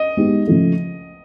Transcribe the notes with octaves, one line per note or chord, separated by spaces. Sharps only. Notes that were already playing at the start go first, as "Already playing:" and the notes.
Already playing: D#5
G#3 B3 D#4 G4
C#3 F3 A3